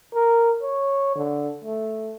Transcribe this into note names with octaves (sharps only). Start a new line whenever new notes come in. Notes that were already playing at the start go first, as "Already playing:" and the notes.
A#4
C#5
D3
A3